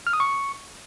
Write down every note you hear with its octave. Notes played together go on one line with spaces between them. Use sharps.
F6
D#6
C#6